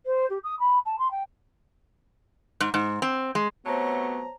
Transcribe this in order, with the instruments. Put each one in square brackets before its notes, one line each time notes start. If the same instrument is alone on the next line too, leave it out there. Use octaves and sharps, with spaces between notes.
[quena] C5
G4
D#6
B5
A5
C6
G5
[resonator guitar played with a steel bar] G#2
G#2
C4
G#3
[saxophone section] C3 F#3 A3 [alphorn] B3 [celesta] C5 C#5 A5 [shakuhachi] A#5